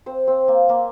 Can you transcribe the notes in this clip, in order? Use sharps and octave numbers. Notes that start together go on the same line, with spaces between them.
C4 C5
C4 C5
A#3 A#4
A#3 A#4